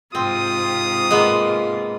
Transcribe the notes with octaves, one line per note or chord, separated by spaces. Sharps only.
G#2 C3 C4 F4 D#6
G#3 A#3 B3